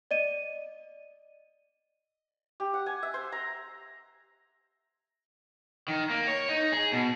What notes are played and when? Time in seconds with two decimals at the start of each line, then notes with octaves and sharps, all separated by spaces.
0.11 D5 D#5 D#7
2.60 G4
2.74 F#5
2.86 G#5
3.03 E5
3.14 C5
3.32 A#5
5.88 D#3
6.10 A#3
6.27 C#5
6.49 D#4
6.72 G#4
6.93 B2